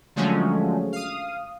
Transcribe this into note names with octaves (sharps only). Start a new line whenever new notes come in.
D3 F3 F#3 G#3 A3 C#4
F5 D#6